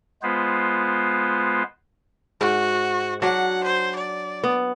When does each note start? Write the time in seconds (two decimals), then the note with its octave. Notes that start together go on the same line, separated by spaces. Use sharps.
0.23 G#3 B3 F4 B4 C5
2.41 G#2 F#4
3.22 F#3 D4 F#5
3.64 C5
3.96 D5
4.44 B3